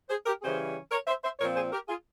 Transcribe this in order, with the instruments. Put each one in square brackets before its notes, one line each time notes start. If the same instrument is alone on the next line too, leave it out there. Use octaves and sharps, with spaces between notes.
[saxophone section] G#4 C5
G4 A#4
C#3 E3 G3 C#4 G#4 C5
A#4 C#5
C5 E5
C5 E5
A#2 F3 C4 A#4 C#5
G#4 C5
G4 A#4
F4 G#4